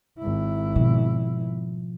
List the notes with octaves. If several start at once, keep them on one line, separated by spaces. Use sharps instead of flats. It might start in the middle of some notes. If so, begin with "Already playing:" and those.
G#1 E4
B2 F3